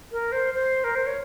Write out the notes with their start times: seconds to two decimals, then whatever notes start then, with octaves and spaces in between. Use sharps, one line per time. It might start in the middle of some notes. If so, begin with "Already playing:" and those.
0.12 A#4
0.32 C5
0.54 C5
0.84 A#4
0.95 C5
1.07 C#5